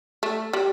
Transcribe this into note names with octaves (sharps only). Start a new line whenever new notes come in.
A3
G3